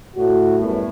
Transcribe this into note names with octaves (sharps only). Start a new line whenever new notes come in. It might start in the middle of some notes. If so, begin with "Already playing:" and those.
A2 F#4
F#2 A2 G3 B3